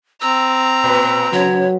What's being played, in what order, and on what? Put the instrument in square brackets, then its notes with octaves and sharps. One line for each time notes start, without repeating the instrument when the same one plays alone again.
[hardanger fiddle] C4 A#5 [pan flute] E6
[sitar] A#2 B4
[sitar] C#3 [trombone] F#3 [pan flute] C#5